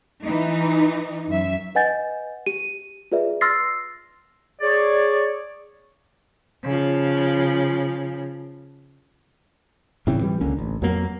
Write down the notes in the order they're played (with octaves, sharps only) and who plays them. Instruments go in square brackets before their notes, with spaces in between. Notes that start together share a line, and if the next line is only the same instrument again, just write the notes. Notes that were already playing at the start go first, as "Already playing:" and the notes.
[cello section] E3 D#4
F#2 E5
[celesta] B4 D#5 F#5 G#5 G6 A6
G4 D#7
F4 G#4 B4 D5 E5
C6 E6 F6 A6 A#6 C7
[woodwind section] G#4 C#5 D5
[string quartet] C#3 F3
[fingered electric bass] A2 C#3 E3 C4
E3 G3
C#2 D3 A#3 C#4
A1
F2 F#3 A#3 B3